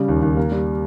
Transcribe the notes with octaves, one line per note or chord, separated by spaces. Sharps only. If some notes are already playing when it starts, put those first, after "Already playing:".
Already playing: C#3 G3
D#2
D#2
A#3
G3